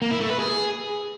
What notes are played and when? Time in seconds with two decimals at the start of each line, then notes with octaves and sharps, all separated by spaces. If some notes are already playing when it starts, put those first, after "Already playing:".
0.02 A#3
0.11 E4
0.21 A3
0.30 B4
0.39 G#4